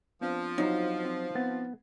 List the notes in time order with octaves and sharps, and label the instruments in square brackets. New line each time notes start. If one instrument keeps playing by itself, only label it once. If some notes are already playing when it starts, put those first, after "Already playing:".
[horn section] F3 [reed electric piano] B3 C4 D4
[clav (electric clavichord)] F#3 C5 C#5 [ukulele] D#4
[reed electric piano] C4
[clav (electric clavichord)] B3 [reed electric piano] C4 A6